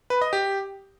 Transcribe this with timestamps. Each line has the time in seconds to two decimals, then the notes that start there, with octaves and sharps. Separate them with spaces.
0.10 B4
0.21 D#5
0.33 G4